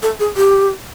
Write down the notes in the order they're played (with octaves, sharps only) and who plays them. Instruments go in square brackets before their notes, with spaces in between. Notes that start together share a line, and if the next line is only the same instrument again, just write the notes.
[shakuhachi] A4
G#4
G4